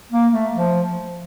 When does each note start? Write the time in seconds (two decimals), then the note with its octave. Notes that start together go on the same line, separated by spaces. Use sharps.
0.12 A#3
0.32 A3
0.54 F3